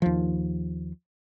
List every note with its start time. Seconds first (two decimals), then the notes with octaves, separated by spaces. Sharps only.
0.02 D#2 F3